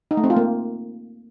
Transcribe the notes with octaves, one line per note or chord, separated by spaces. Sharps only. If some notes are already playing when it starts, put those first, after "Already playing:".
D#4
A3
C4
F4
A#3